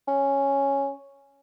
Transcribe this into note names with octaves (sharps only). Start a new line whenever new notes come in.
C#4